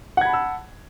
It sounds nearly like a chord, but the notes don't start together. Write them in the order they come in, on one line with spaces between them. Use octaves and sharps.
F#5 G#6 B5 A5 E6